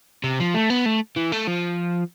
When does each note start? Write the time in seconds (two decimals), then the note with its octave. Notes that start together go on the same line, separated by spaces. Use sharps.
0.24 C3
0.40 F3
0.55 A3
0.70 B3
0.86 A3
1.17 E3
1.32 A3
1.47 F3